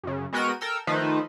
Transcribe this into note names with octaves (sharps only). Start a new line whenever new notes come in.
F#2 C#3
G#3 B3 F#4 A#4 G5 D#7
A4 A#4 G5 E6
D#3 F3 A3 D#4 B4 C5